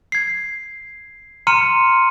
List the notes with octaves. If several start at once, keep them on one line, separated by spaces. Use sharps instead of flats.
G#6 C7
A#5 C6 F6 C#7 D#7